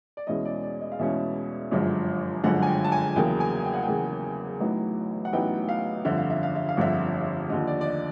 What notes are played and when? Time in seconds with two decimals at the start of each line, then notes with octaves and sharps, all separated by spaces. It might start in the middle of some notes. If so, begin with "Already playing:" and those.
0.17 D5
0.27 E2 B2 G#3 C#4 E4 D#5
0.45 D5
0.63 D5
0.81 D#5
0.92 F5
0.99 E2 B2 G#3 C#4 E4 E5
1.71 G1 F#2 D3 F3 G#3
2.44 G1 F#2 D3 F3 G#3 F#5
2.63 G#5
2.68 G5
2.84 A5
2.92 G#5
3.16 E2 C#3 F#3 A#3 G5
3.40 G#5
3.64 G5
3.74 F#5
3.83 G5
3.88 E2 C#3 F#3 A#3
4.60 A1 A2 F#3 B3 D#4
5.25 F#5
5.33 A1 A2 F#3 B3 D#4 G5
5.69 F5
6.05 G1 F2 D3 E5
6.18 F5
6.30 E5
6.43 F5
6.56 E5
6.69 F5
6.77 G1 F2 D3 E5
7.49 D#2 D3 F3 D#5
7.67 D5
7.81 D5
7.86 D#5